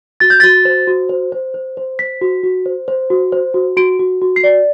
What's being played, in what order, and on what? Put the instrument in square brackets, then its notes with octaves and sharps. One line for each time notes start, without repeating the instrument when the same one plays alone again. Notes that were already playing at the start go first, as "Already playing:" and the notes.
[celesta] F#4 A6
G6
F#4 A6
C5
F#4
C5
C5
C5
C5
C5 B6
F#4
F#4
C5
C5
F#4
C5
F#4
F#4 D7
F#4
F#4
C7
D5